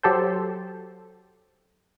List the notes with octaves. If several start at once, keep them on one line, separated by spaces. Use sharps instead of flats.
F#3 G4 A4 C5